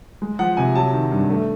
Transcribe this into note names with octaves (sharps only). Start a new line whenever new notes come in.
G#3
F3 F#5
C3 G#5
F#3 A5
D#3
G2
A3